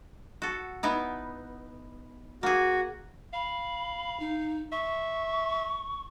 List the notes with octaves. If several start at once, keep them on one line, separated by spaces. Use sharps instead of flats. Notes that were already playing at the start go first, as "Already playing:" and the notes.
F#4 A4
B3 D#4 E4
A#3 F#4 G#4
F5 B5
D#4
E5 C#6